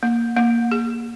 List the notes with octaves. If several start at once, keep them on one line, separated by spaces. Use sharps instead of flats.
A#3
A#3
G#4